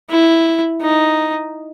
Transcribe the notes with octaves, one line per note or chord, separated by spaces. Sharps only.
E4
D#4